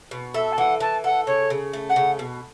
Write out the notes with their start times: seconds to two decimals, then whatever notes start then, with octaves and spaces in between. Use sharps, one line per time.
0.11 B2
0.34 A4 E5
0.52 A5
0.58 E3 F#5
0.80 E3 A5
1.04 A4 F#5
1.27 C#3 C#5
1.50 C#3
1.73 A3
1.89 F#5
1.96 C#3
2.19 B2